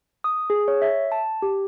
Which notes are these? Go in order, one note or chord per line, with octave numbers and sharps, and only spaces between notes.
D#6
G#4
C#5
E5
A5
G4